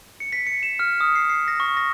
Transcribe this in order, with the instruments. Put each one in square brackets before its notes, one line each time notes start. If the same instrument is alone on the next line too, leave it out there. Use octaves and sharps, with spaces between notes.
[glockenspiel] C#7
B6
C#7
E7
F6
D#6
C7
C7
A#6
C#6
A#6